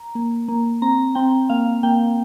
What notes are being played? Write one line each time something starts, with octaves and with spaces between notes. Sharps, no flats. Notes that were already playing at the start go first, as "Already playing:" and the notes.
Already playing: A#5
A#3
A#3
C4 A#5
C4 G5
A#3 F5
A#3 G5